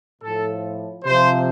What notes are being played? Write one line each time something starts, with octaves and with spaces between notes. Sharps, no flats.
A2 F3 A4
C3 F3 C5